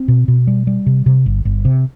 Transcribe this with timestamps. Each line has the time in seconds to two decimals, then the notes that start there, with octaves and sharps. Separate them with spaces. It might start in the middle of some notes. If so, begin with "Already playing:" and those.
Already playing: C4
0.08 B2
0.28 B2
0.47 G3
0.67 G3
0.86 C3
1.06 C3
1.26 G1
1.45 G1
1.65 C3